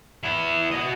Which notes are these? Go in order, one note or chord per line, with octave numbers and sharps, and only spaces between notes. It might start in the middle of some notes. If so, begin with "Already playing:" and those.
B3 E4
F#4 D#5